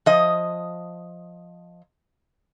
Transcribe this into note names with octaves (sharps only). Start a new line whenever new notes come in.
F3 D#5